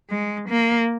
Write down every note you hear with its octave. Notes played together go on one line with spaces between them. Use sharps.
G#3
A#3